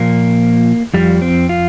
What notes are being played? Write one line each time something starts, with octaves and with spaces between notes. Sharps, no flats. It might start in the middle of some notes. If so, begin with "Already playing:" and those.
Already playing: A#2 F3 A#3
F2 F3 G3
C4
F4